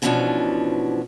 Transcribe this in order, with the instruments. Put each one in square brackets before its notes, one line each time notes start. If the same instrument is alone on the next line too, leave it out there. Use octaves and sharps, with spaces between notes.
[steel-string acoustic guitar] G#2 B2 E3 F3 C#4 D4